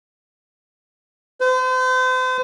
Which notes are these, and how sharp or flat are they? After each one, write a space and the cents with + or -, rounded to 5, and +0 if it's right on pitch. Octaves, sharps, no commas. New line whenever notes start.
C5 -40